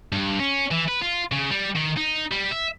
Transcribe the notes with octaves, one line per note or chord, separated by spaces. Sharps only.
G2
C#4
E3
B4
F4
C#3
G3
D#3
D#4
G3
E5